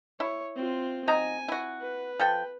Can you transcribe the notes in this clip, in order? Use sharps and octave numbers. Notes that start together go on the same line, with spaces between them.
E4 C#5
C4 F4
F#3 D#4 G#5 A#5
E4 F#4
B4
F3 A4 G5